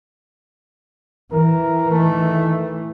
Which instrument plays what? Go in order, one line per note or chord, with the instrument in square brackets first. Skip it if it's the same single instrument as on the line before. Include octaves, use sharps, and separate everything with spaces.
[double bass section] E3 [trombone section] A#4
[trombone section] D#3 A3